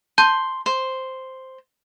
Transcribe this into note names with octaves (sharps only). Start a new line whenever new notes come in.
A5 C6 G6
C5